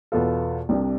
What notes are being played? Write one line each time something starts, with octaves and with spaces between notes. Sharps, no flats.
E2 B2 B3 F4 A4
C2 C3 G3 D4 G4